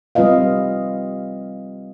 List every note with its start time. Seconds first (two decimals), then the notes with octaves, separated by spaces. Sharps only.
0.15 G3 C4 F4 B4 D#5 F5